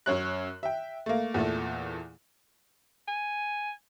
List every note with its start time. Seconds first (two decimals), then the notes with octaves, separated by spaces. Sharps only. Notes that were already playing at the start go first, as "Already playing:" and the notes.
0.06 F#2 C#5 F#6
0.63 E5 G5
1.06 A3 A#3
1.34 E2 A#2 A3 A4
3.08 G#5